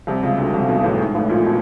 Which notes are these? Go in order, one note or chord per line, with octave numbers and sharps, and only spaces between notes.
C2 C3
C#2 C#3
D2 D3
C2 C3
B1 B2
A1 A2
G#2
A1 A2
A#1 A#2
B2